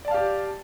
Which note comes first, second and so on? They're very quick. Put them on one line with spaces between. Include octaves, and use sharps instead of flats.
D5 A5 F5 G4